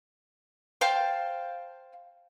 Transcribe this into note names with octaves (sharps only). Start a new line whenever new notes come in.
C5 F5 G5 A5